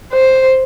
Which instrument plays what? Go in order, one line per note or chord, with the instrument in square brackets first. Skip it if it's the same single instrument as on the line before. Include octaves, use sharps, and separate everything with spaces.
[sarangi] C5